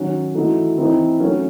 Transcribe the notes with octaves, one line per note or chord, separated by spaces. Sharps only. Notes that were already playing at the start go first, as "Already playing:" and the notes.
Already playing: D#3 F#3 C#4 F#4
E3 A3 D#4 F#4 A4
E3 C4 D#4
F#3 A3 C#4 F#4